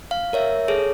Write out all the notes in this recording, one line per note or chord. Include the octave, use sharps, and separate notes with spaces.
F5
A#4 C#5 E5
G#4 A4 C#5